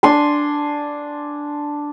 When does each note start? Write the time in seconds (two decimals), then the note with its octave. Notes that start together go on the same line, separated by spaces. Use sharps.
0.03 D4 G#5 C6